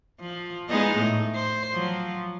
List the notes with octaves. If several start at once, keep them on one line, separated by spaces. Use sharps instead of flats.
F3
G#3 B3 D#4
A2 A3
C5
F3 F#3